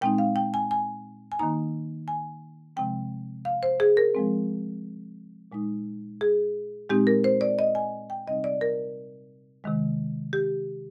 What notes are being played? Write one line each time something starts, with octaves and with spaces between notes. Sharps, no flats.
A#2 G#3 C4 D#4 G5
F5
G5
G#5
G#5
G#5
D#3 A#3 D#4 A#5
G#5
C3 F3 G#3 C4 G5
F5
C5
G#4
A#4
F3 G#3 C4
A#2 G#3 D#4
G#4
A#2 G#3 C4 D#4 G4
A#4
C5
D5
D#5
G#5
G5
C3 G3 C4 D#4 D#5
D5
A#4
C3 D#3 G#3
G4